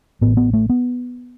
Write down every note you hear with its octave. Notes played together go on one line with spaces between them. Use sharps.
A1 A2 B3
B3
A3
B3